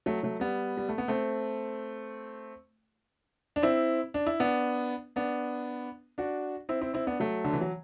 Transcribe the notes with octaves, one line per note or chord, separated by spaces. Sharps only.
F#3 A3
F#3 A3
G3 B3
G3
A3
B3
A3 C4
D4
C4 E4
D4
E4
B3 D4
B3 D4
D4 F#4
C4 E4
C4 E4
C4 E4
B3 D4
F#3 A3
D3
E3
F#3